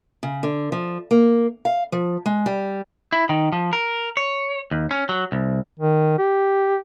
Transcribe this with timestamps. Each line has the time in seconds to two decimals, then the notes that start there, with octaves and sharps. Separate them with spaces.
0.23 C#3
0.43 D3
0.72 F3
1.11 A#3
1.65 F5
1.92 F3
2.26 G#3
2.46 G3
3.12 E4
3.29 D#3
3.52 F3
3.73 A#4
4.17 C#5
4.71 D#2
4.91 C#4
5.09 F#3
5.32 C2
5.79 D#3
6.18 G4